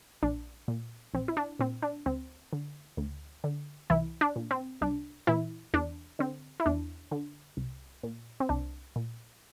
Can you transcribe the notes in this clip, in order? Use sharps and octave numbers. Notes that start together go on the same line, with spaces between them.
A#1 D4
A#2
A#1 C4
E4
D4
A#2 C4
D4
D2 C4
D3
D2
D3
C2 E3 E4
D4
A#2
C4
C2 D4
A#2 E3 E4
E2 D4
D3 C4
E4
E2 D4
D3
C2
A#2
C4
C2 D4
A#2